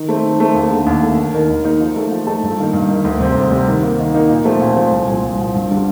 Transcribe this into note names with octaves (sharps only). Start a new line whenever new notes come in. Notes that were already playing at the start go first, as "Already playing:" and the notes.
Already playing: D#3
A3 C4
D#3
A3 C4
D#2
D3 A3
D#2
D3 A3
D#2
D#3 A#3 D#4 A#4
D#2
D#3 A#3 D#4 A#4
F3
A3 D#4 A4
F3
A3 D#4 A4
G2
D#3 A#3 D#4
G2
D#3 A#3 D#4
D2
C3 G3 C4
D2
C3 G3 C4
D#3
A#3 D#4
D#3
A#3 D#4
A#2
F3 A3 C4
A#2
F3 A3 C4
C2
A#2 F3 C4
C2
A#2 F3 C4
G2
D3 G3 D4 F4